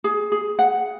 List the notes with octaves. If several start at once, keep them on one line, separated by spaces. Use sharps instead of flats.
G#4
G#4
F#5